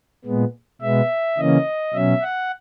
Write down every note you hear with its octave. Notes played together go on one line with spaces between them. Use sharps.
A#2 G#3 B3
B2 G#3 B3 E5
C#3 E3 A#3 C#4 D#5
B2 F#3 C#4 E5
F#5